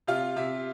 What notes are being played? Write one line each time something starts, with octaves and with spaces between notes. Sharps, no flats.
C3 F4 F5
C3 E5